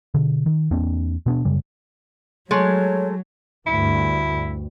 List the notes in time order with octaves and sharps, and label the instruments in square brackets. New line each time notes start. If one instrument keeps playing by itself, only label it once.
[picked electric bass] B2 D3
D#3
E2 A#3 C4 D4
B2 B3 D4
F#2 C#3 G3
[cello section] F#3 [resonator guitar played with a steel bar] G#3 A3 [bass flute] C#5
[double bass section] D2 G2 [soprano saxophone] E4